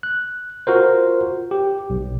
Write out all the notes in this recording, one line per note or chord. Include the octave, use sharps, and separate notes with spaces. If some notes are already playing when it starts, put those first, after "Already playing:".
F#6
F4 F#4 A#4 C5
G4
B1